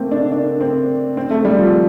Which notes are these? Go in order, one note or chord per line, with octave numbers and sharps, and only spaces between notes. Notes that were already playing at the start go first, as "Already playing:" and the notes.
Already playing: A3 A#3 C4
D4
D4
C4
C4
A3
G3
F3